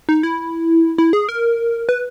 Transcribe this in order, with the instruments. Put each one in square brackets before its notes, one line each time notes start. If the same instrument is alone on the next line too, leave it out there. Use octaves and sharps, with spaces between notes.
[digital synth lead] D#4
E4
E4
G#4
A#4
B4